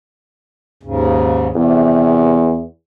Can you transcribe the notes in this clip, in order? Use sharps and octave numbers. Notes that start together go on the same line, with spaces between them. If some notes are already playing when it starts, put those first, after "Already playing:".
D#2 G#2 C#3
E2 C3